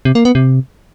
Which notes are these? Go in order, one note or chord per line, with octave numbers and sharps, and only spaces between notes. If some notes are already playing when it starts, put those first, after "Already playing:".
C3
A#3
B3
C3